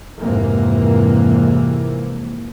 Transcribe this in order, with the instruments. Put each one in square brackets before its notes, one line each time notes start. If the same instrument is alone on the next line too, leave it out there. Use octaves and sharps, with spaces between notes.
[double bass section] F2 G#2 C3 E3 A#3